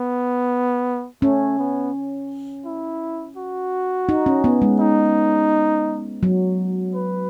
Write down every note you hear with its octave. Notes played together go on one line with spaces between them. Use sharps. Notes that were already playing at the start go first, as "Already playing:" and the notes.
Already playing: B3
A3 C#4
B3
E4
F#4
D#4
C#4
B3
G#3
D#4
F#3
B4